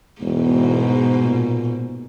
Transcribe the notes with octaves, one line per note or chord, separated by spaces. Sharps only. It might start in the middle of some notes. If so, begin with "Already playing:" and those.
E1 G#2 B2
A#2